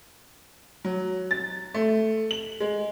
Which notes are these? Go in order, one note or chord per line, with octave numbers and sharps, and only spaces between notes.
F#3
A6
A3
F#7
G#3